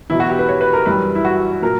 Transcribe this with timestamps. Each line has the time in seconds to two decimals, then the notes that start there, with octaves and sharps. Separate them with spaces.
0.10 E2 B2 F#3 E4
0.20 F#4
0.29 G4
0.39 B4
0.49 C#5
0.61 B4
0.73 A#4
0.86 F#2 E3 G3 B4
1.15 E4
1.25 F#4
1.62 A#2 F#3 A#4